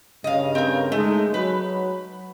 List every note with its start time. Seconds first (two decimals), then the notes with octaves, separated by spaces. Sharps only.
0.24 G2 C#3 D#5 F5
0.55 C4 A#4
0.92 G#3 A3 D#4
1.34 F#3 B4